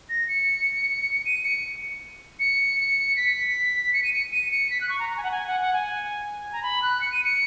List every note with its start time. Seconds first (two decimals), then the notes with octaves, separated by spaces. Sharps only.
0.09 A#6
0.28 C#7
1.26 D#7
1.44 C#7
2.40 C#7
3.16 B6
3.93 C#7
4.04 D#7
4.13 C#7
4.32 D#7
4.51 C#7
4.70 B6
4.81 F#6
4.89 C#6
4.99 A#5
5.10 A#5
5.17 G#5
5.24 F#5
5.31 G#5
5.47 F#5
5.61 F#5
5.73 G#5
6.52 A#5
6.63 B5
6.82 F#6
7.01 C#7
7.12 D#7
7.24 C#7